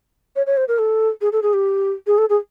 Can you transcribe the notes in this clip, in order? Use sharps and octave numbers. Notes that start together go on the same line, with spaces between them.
C#5
C#5
C5
A#4
A4
G#4
A4
G#4
G4
G#4
A4
G#4